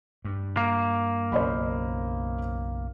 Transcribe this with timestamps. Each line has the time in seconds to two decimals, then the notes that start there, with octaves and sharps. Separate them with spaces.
0.25 G2
0.57 A#3
1.32 B1 F#2 C#3 C5 D#5 B5